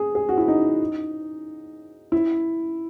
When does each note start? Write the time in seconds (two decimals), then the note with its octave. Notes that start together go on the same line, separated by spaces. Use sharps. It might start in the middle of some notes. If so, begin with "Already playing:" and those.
Already playing: G#4
0.15 G#4
0.29 F#4
0.38 E4
0.48 D#4
2.12 E4